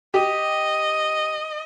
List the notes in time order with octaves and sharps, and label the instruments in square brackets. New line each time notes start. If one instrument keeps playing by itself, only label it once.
[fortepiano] G4 [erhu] D#5